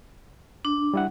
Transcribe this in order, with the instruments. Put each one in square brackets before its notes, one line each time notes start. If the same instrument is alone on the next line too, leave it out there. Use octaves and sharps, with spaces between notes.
[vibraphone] D4
[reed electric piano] G3 E4 F#5